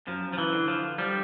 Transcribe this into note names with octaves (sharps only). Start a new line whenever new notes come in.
F#2 F3
F3
E3
D3
F3
F3 G3